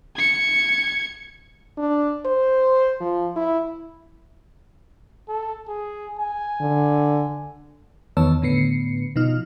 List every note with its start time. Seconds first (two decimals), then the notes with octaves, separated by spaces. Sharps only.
0.16 G#6 C#7
1.78 D4
2.26 C5
3.01 F3
3.36 E4
5.29 A4
5.68 G#4
6.19 G#5
6.61 D3
8.17 E2 D#3 B3 C#5 A5 E6
8.42 A2 D3 B3 C7 C#7
9.16 B2 F3 D#4 F6